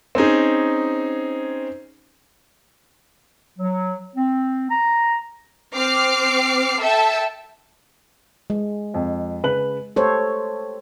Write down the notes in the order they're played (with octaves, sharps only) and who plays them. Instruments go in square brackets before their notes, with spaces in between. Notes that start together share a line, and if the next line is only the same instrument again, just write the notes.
[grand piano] C4 C#4 D#4 G#4
[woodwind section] F#3
C4
A#5
[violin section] C4 D6 F6 C7
A4 E5 G5 A5
[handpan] G#3
[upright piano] F2
C#3 B4 F#7
[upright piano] A3 G4 [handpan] A4 C5 C#5